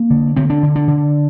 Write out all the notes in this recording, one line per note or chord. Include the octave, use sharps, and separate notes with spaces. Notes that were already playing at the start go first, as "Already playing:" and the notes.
Already playing: A#3
D3
D3 C4
D4
D3
D4
D3